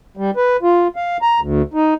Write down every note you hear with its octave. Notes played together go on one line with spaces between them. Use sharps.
G3
B4
F4
F5
A#5
D2
D#4